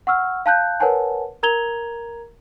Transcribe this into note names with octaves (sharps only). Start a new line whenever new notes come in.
F#5 C#6 E6 F6
F5 A5 F#6 G6
A#4 B4 C#5 F#5 G#5 A5
A#4 A#5 G#6 F7 G7